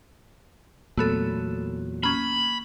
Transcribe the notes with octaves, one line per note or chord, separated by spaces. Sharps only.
E2 A#2 F#3 A3 B3 A4
A#3 C#4 B5